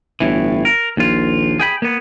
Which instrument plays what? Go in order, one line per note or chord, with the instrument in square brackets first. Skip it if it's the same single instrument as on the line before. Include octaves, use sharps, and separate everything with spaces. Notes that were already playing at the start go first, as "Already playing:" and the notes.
[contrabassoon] G1 [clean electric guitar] A2 E3
[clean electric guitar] A#4
[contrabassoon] A#1 [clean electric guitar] D#2 F4
[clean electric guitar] G#4 G5 B5
A#3 B3